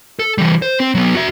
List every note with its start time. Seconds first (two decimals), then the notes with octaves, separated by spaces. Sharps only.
0.19 A4
0.38 E3 G3
0.62 C5
0.80 C4
0.95 F#3 B3
1.15 F#4 E5